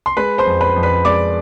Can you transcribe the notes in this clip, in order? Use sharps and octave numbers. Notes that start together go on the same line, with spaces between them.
C6
G#3 B4 B5
C5 C6
F2
B4 B5
F2
B4 B5
G#3 D5 D6